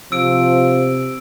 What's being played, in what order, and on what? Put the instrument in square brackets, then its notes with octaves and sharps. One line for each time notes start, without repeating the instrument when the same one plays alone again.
[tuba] C3 [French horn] F3 [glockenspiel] E6 D7